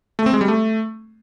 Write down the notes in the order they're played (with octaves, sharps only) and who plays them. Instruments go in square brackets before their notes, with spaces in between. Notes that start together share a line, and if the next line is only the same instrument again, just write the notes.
[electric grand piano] A3
C4
G#3
G3
A3